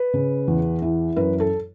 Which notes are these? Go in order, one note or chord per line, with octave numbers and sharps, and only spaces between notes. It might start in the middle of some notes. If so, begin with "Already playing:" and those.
Already playing: B4
C#3
E2
E3
F#2 B4
A4